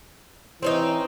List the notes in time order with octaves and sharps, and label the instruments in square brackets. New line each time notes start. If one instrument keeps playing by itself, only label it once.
[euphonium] E3 [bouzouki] C4 C#4 D#4